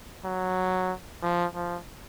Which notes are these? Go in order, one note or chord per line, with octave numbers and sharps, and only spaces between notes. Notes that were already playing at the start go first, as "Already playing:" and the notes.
F#3
F3
F3